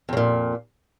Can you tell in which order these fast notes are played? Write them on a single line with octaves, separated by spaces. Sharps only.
F2 C#3 A#2